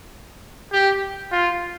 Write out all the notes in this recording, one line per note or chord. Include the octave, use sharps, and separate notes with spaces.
G4
F4